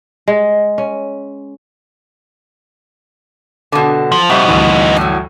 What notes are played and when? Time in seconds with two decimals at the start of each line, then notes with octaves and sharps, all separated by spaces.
0.28 G#3
0.78 C#4
3.72 B2 D3
4.12 F3
4.30 F2 G3 D#4 F#4 C5 E5
4.48 D2 G2 E3
4.97 A2 F#3